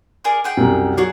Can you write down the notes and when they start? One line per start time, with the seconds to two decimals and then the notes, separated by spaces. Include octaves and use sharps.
0.24 G#4 A#4 D5
0.44 G#4 F#5 G5
0.57 C2 F#2
0.97 F#3 F#4 G#4 D5